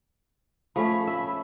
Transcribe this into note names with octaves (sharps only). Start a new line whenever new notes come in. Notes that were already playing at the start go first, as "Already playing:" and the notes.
F3 A3 C#4 B5
E5